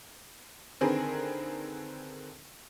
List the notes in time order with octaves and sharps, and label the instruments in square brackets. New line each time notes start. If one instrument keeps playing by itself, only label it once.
[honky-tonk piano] D3 D#3 C4 G#4 A#4 B4